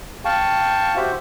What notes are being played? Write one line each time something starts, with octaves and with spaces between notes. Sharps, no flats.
F5 G5 A5 C#6
F#4 G4 C5 E5